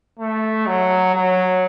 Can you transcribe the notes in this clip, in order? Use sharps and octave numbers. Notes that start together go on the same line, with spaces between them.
A3
F#3
F#3